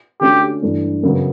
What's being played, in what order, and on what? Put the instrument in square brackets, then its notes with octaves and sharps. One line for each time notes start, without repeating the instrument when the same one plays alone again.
[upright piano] D3 A3 C#4 F#4 [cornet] G4
[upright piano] G2 E3 A3 D4
F#2 C#3 F#3 B3